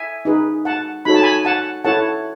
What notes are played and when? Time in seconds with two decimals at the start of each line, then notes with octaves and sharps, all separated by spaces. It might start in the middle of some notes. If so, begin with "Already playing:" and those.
Already playing: E5 G#5
0.25 D#4 G#4 B4
0.65 F#5 A5
1.05 D#4 F#4 A4 C#5 B5
1.14 A5
1.22 G#5 B5
1.45 F#5 A5
1.85 E4 A4 C#5 F#5 A5